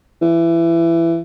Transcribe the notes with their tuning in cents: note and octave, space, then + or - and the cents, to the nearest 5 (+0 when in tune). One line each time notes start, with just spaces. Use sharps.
E3 +20